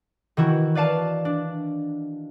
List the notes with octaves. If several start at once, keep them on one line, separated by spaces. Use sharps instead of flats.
D#3 E3 E4 F#4
B4 D5 F5 A5
D4